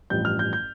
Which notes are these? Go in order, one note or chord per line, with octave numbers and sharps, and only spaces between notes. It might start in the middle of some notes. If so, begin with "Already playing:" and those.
A1 G2 F3 G6
F6
G6
G6